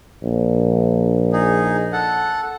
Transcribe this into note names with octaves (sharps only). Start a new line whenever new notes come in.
A#1
D#4 G#4
A4 F#5